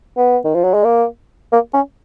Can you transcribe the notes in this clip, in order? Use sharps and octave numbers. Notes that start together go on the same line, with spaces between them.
B3
D#3
F3
F#3
G#3
A#3
A#3
C#4